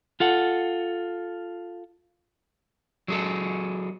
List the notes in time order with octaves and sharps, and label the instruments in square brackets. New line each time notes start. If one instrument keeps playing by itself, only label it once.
[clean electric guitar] F4 A4 F#5
[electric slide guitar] F#3 G#4 A4